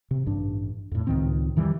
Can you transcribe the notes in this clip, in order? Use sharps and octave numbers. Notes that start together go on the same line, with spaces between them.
C3
A1 G2 D4
F2 A2
C#2 A2 D#3 C4
F2 D#3 E3 G3